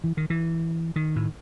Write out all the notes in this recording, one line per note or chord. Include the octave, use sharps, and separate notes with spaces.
E3
D#3
E3
D#3
A2